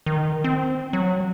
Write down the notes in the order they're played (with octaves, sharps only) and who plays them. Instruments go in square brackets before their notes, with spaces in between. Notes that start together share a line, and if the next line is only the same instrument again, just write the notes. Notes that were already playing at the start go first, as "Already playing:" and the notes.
[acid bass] D#3
C4
F#3